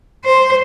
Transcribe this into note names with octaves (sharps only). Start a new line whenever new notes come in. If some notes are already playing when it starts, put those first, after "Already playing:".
C5